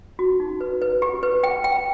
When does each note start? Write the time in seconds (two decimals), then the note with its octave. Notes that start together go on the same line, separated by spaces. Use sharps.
0.19 F#4
0.40 D#4
0.61 B4
0.82 B4
1.02 G4
1.23 B4
1.43 G5
1.64 G5